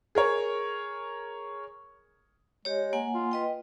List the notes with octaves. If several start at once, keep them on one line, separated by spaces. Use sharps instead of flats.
G#4 A#4 C#5
G#3 G4 C#5
A#3 F#5 G#5
F4
B4 D#5 G5